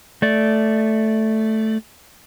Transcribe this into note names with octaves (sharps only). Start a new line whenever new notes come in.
A3 D5